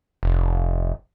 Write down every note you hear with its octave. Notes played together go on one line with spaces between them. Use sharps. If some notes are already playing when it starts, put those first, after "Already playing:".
F1